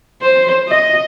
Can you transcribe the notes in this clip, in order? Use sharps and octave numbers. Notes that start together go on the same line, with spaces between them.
C5
D#5